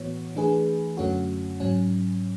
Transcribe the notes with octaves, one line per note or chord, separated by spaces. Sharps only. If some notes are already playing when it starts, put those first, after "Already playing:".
Already playing: A2 E3 B3 F#4 C#5
E3 A3 D4 G#4 B4
F#2 D3 A3 C#4 F#4
G#2 F#3 C#4